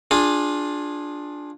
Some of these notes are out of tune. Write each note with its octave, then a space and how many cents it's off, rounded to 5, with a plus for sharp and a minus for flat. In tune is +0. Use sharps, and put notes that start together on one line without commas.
D4 +0 F4 +15 G#4 -10